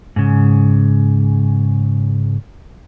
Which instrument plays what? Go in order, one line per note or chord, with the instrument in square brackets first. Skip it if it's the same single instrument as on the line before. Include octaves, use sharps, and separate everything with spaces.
[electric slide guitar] G#2 C#3